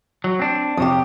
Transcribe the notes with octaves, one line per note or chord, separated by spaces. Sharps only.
F#3
C4 D4
F2 C3 G4 C#5 D#6